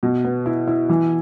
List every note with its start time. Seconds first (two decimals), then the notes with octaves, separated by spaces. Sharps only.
0.03 B2
0.25 B3
0.46 E4
0.68 E4
0.89 E3